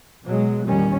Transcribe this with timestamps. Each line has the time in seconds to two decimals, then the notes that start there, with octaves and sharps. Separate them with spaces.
0.24 B2 F#3 G#3
0.66 E2 A#2 D#3 G3 C#4